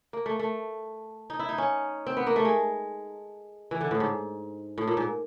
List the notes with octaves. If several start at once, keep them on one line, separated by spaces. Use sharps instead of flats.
A#3
A3
A3
D#4
E4
D#4
C#4
C4
B3
A#3
A3
G#3
E3
D3
A2
G#2
A2
A#2
G#2